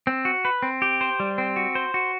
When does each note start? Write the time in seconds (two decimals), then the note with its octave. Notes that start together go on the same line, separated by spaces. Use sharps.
0.07 C4
0.25 F#4
0.45 B4
0.62 C4
0.82 G4
1.01 C5
1.20 G3
1.38 C4
1.56 F#4
1.75 C5
1.94 F#4